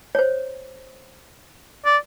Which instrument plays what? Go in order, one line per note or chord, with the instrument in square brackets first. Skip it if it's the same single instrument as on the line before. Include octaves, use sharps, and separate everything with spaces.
[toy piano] C5 C#5
[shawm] D5